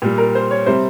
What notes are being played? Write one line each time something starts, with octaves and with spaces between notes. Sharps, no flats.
A#2 G3
A#4
C5
C#5
C3 G3 C5